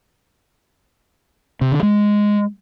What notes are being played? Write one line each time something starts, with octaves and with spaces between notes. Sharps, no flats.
C3
D3
G#3